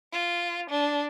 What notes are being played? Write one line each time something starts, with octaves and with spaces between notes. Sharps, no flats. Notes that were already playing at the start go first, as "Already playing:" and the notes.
F4
D4